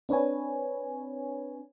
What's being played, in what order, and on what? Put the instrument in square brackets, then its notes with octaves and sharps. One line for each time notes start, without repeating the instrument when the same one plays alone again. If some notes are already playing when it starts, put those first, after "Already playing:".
[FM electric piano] C4 D4 B4 C#5 G#5